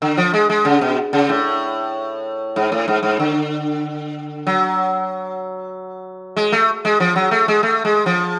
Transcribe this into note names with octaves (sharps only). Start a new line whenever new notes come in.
D3
F3
G#3
G#3
C#3
B2
C#3
A2
G#2
A2
G#2
G#2
D3
F#3
G#3
A3
G#3
F3
F#3
A3
G#3
A3
G#3
F3